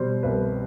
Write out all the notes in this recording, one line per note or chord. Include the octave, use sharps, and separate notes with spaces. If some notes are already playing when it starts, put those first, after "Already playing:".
Already playing: B2 G3 C5
C2 B4